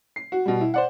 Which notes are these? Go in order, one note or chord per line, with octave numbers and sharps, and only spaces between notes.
C7
F#4
B2 G3
E4
C5 D5 F#5